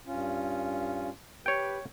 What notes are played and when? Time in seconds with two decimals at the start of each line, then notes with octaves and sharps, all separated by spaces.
0.07 G2 C#4 F4
1.46 G4 B4 C#5 G5